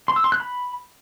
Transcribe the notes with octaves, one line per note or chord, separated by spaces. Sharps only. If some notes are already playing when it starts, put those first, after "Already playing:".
C6
E6
C6
F#6
B5